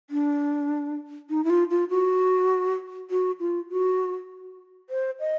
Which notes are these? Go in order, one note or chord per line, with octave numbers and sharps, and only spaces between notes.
D4
D#4
E4
F4
F4
F#4
F#4
F4
F#4
C5
D#5